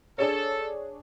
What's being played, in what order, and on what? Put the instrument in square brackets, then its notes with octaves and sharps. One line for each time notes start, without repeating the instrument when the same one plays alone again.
[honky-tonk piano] D4 G#4 C#5 [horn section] A4